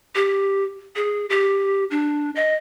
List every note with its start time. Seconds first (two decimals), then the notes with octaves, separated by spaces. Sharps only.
0.15 G4
0.96 G#4
1.30 G4
1.91 D4
2.35 D#5